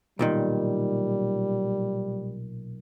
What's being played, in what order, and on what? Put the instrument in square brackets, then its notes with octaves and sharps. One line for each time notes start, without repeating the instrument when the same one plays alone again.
[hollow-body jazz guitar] B1 A#2 D#3 [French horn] G3